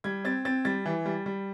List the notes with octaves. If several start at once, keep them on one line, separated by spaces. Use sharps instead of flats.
G3 G#6
C4 A6
C4 A6
G3 A6
E3
G3
G3